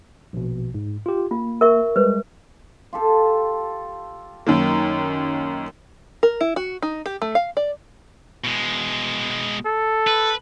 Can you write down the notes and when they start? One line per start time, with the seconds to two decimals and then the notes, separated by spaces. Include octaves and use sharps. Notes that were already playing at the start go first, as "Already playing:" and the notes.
0.33 A#1 B2
0.74 G#2
1.06 F4 G4
1.31 A#3 F4
1.61 A#4 E5 C#6
1.96 G3 G#3 B4 C5
2.93 F4 G4 A4
4.47 F#2 D#3 A#3
6.23 A#4
6.41 E4
6.56 F#4
6.82 D#4
7.06 G4
7.22 A3
7.35 F5
7.57 D5
8.44 B2 G#3
9.66 A4
10.07 B4